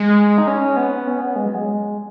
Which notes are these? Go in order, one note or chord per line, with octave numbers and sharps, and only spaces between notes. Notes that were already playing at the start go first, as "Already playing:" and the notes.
Already playing: G#3
D#4
C#4
B3
C#4
B3
G#3
F#3
G#3